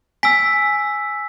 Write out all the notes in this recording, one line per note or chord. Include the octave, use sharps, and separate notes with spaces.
G#5 E6 B6